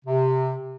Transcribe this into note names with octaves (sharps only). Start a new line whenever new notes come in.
C3